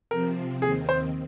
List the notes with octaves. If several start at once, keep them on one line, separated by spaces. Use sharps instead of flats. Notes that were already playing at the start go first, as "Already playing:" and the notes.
C3 F3 C4 A#4
D#2 D#3 C4 G#4
C5